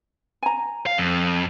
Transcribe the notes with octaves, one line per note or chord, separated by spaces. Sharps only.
G#5 A#5
F5
F2